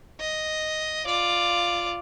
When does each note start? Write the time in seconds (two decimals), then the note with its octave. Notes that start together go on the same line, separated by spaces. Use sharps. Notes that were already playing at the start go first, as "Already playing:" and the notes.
0.20 D#5
1.05 F4 D5